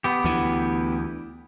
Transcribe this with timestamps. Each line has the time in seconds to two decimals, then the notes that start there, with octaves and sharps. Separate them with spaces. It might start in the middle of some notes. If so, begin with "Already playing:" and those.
0.04 B3 G4
0.24 D2 E3